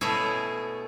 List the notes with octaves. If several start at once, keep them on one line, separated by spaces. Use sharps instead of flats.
B2 A3 E4 G#4 C#5